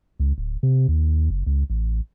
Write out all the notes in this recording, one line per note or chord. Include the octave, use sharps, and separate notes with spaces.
C#2
D1
C3
D#2
F#1
C#2
A1